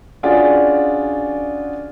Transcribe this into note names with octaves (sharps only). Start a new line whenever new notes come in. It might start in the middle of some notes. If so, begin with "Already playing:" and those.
C#4 D4 F4 F#4 G#4 D5